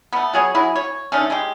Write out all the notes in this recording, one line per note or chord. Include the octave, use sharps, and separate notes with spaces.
A3 B3
F#3 G#4 C#5
F#3 E4 G#4
C#5
D3 D#3 A3 C#4
G#3 G4